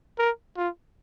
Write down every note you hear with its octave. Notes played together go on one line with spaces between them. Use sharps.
A#4
F4